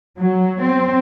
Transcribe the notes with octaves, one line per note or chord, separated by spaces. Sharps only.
F#3
C4